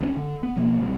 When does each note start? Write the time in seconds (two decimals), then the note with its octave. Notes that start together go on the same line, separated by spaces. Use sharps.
0.01 D2 A#3 C#4
0.16 D3
0.43 B3
0.56 B2 F3 A#3 B3
0.80 B1 A2 C3 G3